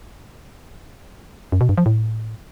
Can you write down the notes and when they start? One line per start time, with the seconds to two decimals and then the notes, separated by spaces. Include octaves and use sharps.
1.52 F#2
1.61 B2
1.69 G2
1.78 F3
1.86 A2